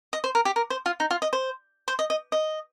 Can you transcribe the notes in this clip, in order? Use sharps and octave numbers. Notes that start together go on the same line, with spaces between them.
D#5
C5
A#4
G4
A#4
C5
F4
D#4
F4
D#5
C5
C5
D#5
D#5
D#5